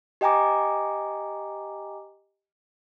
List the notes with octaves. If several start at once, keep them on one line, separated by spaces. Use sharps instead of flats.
G4 D#5 G5 G#5 A#5 D6